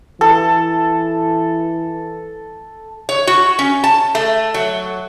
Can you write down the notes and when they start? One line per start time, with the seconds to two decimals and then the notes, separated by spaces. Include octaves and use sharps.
0.21 E3 A4
3.09 C#5
3.27 F#4
3.59 C#4
3.84 A5
4.15 A3
4.54 F#3